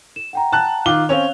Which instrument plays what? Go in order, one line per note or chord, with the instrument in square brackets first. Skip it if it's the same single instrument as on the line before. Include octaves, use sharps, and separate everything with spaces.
[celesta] E7
F#5 G5 A#5
[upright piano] A5 F#6
[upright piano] D#3 F4 G7 [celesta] D6
[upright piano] C4 C#4 C#5 [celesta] F5 F7